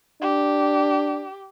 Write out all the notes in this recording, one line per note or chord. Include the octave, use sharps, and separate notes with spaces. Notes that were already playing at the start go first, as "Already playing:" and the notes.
D4 G4